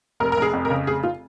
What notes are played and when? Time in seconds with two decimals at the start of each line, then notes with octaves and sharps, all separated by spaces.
0.20 F1 A#4
0.32 A#4
0.37 F1 G#4
0.53 F2
0.65 A#4
0.70 C#3
0.87 F1 G#4
1.04 F4